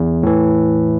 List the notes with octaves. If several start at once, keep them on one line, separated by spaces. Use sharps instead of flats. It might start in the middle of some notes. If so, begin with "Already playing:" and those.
Already playing: E2
A2 E3